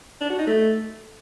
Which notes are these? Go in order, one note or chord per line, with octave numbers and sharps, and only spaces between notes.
D4
F#4
D#4
A3